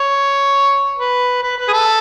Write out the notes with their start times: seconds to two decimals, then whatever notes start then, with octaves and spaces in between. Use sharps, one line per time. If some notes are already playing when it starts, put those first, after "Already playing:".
Already playing: C#5
0.99 B4
1.43 B4
1.58 B4
1.68 G#4
1.73 A4